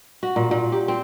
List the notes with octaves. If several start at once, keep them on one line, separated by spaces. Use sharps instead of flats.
F#4
A#2
A#2
G4
C4